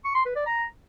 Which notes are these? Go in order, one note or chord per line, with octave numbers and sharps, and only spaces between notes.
C#6
C6
B4
D5
A#5